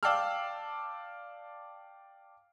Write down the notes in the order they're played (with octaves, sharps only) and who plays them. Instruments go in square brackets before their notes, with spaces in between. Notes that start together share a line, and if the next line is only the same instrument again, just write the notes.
[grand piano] D5 F5 G5 A5 E6 F6